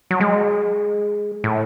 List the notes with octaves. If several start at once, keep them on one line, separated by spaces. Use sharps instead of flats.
F#3
G#3
A2